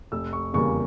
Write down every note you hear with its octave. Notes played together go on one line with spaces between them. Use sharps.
F1 E6
C#6
E2 C#3 G3 A#3 C#6